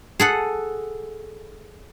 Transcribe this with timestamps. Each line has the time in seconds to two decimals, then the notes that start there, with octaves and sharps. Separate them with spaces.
0.20 G#4 A4 F#5